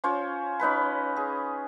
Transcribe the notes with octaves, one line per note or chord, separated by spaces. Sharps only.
C#4 F4 C5 C#5
C#4 D#4 B4 B5
G#4